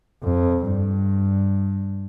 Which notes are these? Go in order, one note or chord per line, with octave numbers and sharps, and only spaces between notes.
F2
G2